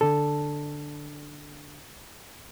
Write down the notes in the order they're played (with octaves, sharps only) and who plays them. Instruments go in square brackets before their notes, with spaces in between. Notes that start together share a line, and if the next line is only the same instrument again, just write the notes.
[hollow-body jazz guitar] D3 A4